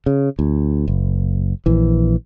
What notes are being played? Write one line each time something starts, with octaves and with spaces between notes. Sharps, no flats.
C#3
D2
F#1
A#1 E3